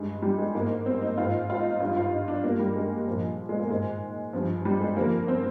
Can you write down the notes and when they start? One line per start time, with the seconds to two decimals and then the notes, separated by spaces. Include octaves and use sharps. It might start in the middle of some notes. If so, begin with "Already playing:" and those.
Already playing: G2 D#3 G#3
0.22 G3
0.38 G#3
0.54 G#2 D#3 A#3
0.86 C4
1.02 D#4
1.18 G#2 D#3 F4
1.50 F4
1.59 D#4
1.71 D#4
1.80 G2 D#3 F4
1.96 F4
2.13 D#4
2.28 D4
2.44 G2 D#3 A#3
2.59 G3
2.75 G#3
3.07 A#2 F3
3.49 G#3
3.60 A#3
3.70 G#2 D#3 G#3
4.33 G2 F3
4.65 G3
4.81 G#3
4.96 F2 D3 F3 A#3
5.28 C4